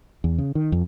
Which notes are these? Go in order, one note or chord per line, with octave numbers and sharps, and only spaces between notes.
E2
C#3
D#3
F2